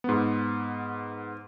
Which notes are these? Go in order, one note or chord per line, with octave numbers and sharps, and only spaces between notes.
G#2 B3